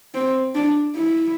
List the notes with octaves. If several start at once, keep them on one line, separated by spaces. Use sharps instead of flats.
C4
D4
E4